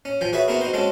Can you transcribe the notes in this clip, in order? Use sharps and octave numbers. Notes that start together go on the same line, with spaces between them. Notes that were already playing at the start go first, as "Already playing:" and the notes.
C#4
F3 G5 G#5
F#4 G#4 B4 C#5 E5 G#5
B3 C4 E4 F#4 G#4 A#4
D#4 F#4 C5
G#3 C4 C#4 F#4 A4